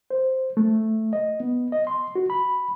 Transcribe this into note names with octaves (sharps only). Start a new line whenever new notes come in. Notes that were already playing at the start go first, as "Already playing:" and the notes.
C5
A3
D#5
B3
D#5
C6
F#4
B5